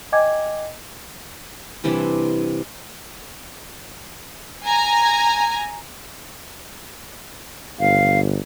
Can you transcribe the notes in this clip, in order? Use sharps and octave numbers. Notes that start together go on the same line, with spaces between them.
D#5 G5 G#5 D6 G#6
C3 E3 G3 D4
G#5 A#5
G1 F5